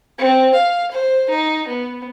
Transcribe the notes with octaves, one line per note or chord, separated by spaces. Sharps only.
C4
F5
C5
D#4
B3